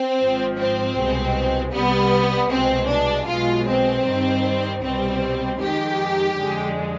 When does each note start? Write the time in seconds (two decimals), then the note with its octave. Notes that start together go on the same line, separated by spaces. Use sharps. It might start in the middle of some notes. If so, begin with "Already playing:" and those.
Already playing: C4
0.18 G#1 G#2 F3
0.57 C4
0.96 C2 B2 G#3
1.73 C2 C3 G3 B3
2.51 C2 B2 G#3 C4
2.89 D4
3.28 B1 B2 G#3 F4
3.67 C4
4.06 G2 D#3 G3
4.82 C2 B2 G3 C4
5.60 F2 D#3 G#3 G4
6.38 F2 D3 G#3